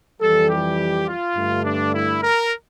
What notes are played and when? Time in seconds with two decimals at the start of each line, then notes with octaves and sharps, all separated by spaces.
0.21 F2 E3 G3 A4
0.49 G4
1.07 F4
1.35 G2 D3 A3
1.64 D4
1.93 E4
2.22 A#4